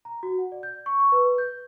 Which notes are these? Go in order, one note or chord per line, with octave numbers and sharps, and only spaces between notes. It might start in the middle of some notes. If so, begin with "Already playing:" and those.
A#5
F#4
F#5
D5
G6
C#6
C#6
B4
G6